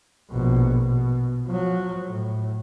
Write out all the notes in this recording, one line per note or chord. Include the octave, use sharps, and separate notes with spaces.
A#1 B2
B2
F3 F#3
A2